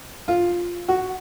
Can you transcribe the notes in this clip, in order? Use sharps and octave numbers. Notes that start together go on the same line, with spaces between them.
F4
F#4